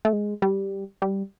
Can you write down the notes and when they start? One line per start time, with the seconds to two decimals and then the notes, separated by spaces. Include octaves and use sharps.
0.05 A3
0.13 G#3
0.42 G3
1.02 G3